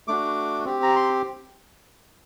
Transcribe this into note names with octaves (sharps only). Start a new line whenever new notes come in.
A3 D4 F#4 D6
C4 G4
A#5
C6